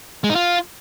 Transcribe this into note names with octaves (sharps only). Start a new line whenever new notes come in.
G#3
D#4
F4